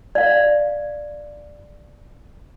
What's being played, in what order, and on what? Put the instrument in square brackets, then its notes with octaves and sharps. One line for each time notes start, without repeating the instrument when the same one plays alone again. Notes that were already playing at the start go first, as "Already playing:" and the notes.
[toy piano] D5 F5